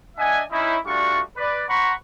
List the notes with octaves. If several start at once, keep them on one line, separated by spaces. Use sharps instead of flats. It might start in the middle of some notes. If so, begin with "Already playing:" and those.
D4 D#5 E5 F#5 G#5
C#4 D#4 E4
G3 A3 D4 F4 F#4 C#6
B4 D5
C5 F#5 A#5 B5 C#6